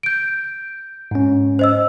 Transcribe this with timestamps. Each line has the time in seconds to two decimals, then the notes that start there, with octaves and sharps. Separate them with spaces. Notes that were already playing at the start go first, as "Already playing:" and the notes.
0.03 G6 D7
1.11 G#2 C#4
1.59 C5 D#5 E6